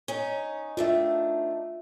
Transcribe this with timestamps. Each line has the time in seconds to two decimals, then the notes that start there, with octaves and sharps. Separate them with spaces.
0.08 C#4 D#4
0.77 D#3 A3 D4 F4 E5